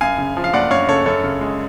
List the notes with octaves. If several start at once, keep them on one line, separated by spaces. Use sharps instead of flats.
F#2 F5 G#5
C#3
F3
F5
F#1 D5 F#5
F#2 C#5 F5
C#3 A4 C#5
F#2 A4 C#5
C#3
G#3